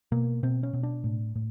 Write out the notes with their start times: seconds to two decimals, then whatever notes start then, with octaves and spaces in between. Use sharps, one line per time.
0.12 B2 A#3
0.43 B2 C4
0.63 C#4
0.73 B2
0.83 D4
1.04 A2
1.35 A2